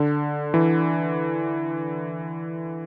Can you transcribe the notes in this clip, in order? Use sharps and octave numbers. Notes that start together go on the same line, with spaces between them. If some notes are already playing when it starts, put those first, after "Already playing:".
Already playing: D3
E3